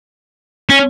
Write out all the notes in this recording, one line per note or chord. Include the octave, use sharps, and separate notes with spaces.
C#4